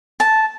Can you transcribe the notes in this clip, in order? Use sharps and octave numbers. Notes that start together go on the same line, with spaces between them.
A5